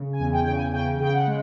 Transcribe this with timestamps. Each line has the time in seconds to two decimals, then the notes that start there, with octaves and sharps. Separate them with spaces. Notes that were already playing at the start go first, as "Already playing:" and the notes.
Already playing: C#3
0.13 G#5
0.19 E2
0.33 G5
0.44 C#3 G5
0.53 G#5
0.73 C#3 G5
1.00 C#3 G5
1.13 F#5
1.27 G#3